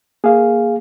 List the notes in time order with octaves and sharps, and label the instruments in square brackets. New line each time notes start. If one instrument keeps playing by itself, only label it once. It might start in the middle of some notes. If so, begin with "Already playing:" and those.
[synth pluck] A#3 [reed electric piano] G#4 F5